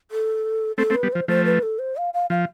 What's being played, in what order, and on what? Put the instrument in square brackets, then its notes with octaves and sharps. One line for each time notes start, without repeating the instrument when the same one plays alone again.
[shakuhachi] A4
[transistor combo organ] A3 C4 [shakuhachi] A4
[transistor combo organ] A3 C4
[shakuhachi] B4
[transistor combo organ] G3 B3
[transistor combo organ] F3 [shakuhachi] C5
[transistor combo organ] F3 A3 [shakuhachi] C5
[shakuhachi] B4
A4
C5
F5
F5
[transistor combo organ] F3 [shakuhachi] F5